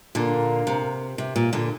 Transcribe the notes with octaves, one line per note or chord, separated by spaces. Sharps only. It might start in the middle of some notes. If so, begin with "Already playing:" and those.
A#2 D3 A#4 F5 A#5
C3
C3
A#2
A#2 D3